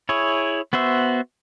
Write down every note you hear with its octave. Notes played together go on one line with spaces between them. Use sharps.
E4 G#4 C#5
B3 F#4 C5 E5